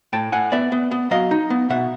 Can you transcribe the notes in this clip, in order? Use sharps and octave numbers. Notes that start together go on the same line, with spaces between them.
A2 G5 A5
A2 F#5 G#5
B3 D5 E5
B3
B3
F#3 D#5 F5
D#4
B3
B2 E5 F#5